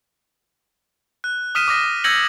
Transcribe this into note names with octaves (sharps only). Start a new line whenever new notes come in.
F#6
D#6 F6 B6 D#7 E7
D6 D#6 A#6 B6
E6 G6 G#6 A#6 C#7 F#7